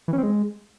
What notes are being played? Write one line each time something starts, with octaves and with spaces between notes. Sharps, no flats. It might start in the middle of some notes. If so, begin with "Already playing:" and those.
E3
C#4
C4
G#3